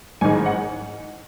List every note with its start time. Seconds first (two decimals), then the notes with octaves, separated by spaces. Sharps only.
0.21 A1 G#2 D#3 G#3 G#5
0.46 F#5